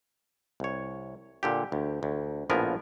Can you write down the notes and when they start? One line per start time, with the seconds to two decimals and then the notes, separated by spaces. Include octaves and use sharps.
0.60 C2 C#5
1.43 A#2 D3 G4
1.72 D2
2.03 D2
2.50 A#1 A2 F3 B3 A#4 G#5